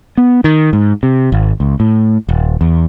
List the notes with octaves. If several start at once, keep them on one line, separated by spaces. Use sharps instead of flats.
B3
D#3
G#2
C3
G#1
C#2
A2
D#1
E2